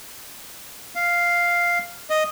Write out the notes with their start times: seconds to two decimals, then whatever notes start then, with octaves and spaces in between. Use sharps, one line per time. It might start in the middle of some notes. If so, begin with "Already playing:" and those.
0.95 F5
2.10 D#5